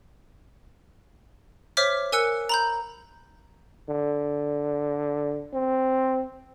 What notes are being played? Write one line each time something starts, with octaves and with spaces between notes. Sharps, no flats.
C5 C#5 E5 D6 F6 B6
A#4 G#5 E6 F#6 C#7
A#5 B5 G6
D3
C4